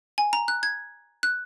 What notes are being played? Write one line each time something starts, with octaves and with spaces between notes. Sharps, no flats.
G#5
A#5
F#6
G#6
F#6